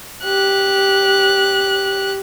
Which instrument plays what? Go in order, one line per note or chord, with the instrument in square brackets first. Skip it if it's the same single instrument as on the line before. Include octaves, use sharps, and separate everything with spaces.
[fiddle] G4 F#6